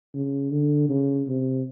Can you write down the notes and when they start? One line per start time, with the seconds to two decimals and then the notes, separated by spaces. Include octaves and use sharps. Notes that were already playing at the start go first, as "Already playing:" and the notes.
0.14 C#3
0.52 D3
0.89 C#3
1.28 C3